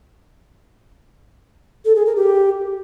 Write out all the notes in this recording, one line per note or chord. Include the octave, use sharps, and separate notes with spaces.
A4
G#4
A#4
G4